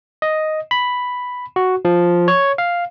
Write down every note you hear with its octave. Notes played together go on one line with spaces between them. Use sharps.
D#5
B5
F#4
F3
C#5
F5